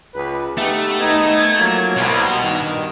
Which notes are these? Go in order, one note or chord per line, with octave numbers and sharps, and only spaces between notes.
C#2 B4
A3 B3 D#4 G4
G#1 B3 D#4 G#6
F3 F#3 A#3
C2 B2
G2 D#3